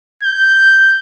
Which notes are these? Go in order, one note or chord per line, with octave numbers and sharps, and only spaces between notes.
G6